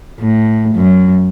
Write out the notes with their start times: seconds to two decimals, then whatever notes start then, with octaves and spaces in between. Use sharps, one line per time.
0.20 A2
0.75 F#2